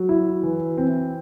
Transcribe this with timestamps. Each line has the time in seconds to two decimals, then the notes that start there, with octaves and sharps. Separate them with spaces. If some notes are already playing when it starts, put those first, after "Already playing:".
Already playing: F#3
0.09 E4
0.43 E3
0.77 C4